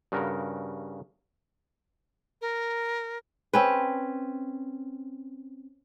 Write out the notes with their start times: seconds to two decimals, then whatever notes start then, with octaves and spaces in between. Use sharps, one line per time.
0.12 G2 C#3 F#4 A#4
2.41 A#4
3.53 C4 C#4 B4